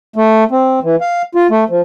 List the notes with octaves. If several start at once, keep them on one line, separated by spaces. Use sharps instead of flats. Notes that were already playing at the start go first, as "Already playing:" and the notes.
A3
C4
E3
F5
F4
A3
F3